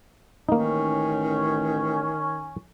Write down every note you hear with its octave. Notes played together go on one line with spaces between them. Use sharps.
A1 D#3 A#3 C#4 D#4